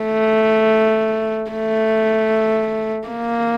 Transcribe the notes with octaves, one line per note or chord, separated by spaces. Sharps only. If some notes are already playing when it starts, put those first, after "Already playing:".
Already playing: A3
A3
A#3